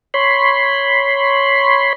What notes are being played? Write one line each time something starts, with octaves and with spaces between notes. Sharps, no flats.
C#5 B5 C6